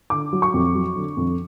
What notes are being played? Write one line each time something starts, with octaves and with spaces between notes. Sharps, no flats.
D3 D6
F#3
C#6
F2
F#3
D3
F2